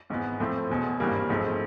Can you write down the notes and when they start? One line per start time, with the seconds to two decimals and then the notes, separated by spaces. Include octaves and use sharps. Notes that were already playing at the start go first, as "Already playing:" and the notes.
0.10 G#1 G#2 E3 G#3 B3
0.40 A2 F3 A3 C4
0.69 E1 E2 B2
1.00 G#1 G2 E3 G3 A#3
1.29 A1 G#2 F3 A3 C4